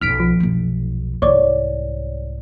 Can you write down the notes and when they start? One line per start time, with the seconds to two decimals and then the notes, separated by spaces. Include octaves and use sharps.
0.01 B1 C#3 F6 B6 D7
0.20 F3
0.40 F1 B1
1.22 C2 G#2 C#5 D5